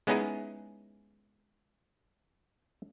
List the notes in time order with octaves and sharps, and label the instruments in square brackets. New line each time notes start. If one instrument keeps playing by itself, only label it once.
[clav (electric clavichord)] G#3 B3 C#4 D#4 E4 G#4